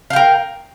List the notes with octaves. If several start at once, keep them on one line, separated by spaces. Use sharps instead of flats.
A#4 F5 G5